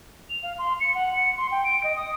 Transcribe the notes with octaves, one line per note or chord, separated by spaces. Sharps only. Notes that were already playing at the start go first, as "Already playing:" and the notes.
F7
F5
C6
C#7
F#5
C#7
C6
G5
D7
D#5
D#6